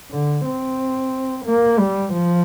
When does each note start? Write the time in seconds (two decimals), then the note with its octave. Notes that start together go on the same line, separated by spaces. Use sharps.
0.11 D3
0.45 C4
1.45 A#3
1.79 G3
2.13 F3